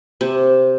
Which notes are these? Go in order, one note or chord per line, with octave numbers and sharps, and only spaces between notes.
C3